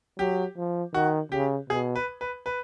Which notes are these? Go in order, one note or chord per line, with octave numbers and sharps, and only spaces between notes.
F#3 G4
F3
D#3 F#4
C#3 G4
B2 G#4
B4
B4
B4